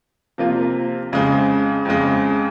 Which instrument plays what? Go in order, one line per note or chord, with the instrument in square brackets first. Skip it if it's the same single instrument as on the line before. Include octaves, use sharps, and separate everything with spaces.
[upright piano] C3 F3 A#3 F4
F2 C#3 G#3
F2 C#3 G#3